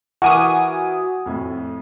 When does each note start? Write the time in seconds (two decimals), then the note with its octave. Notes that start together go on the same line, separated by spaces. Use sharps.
0.22 E3 F#4 A#4 G#5 D6 D#6
1.26 F2 A2